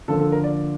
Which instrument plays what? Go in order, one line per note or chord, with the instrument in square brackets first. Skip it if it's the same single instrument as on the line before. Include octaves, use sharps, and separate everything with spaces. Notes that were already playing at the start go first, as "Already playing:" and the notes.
[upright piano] D3 F3 A#3 D4 A4
A4
A#4
D5